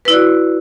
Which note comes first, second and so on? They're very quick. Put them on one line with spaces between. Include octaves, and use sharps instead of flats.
B4 E4 D5 F#4